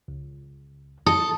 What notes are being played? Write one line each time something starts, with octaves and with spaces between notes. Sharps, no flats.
C#2
A4 D#6